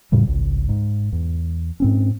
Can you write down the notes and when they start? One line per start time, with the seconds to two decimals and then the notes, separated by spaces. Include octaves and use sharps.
0.12 E2 A2 C#3 G3
0.26 G#1 C#2
0.69 G#2
1.12 E2
1.80 G#2 C4 C#4